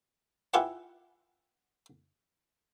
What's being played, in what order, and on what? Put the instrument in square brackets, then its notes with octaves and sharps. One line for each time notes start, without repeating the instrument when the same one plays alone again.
[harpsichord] E4 F4 G4 G#4 B4 F#5